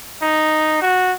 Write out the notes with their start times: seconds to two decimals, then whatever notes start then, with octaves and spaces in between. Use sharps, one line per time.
0.22 D#4
0.82 F#4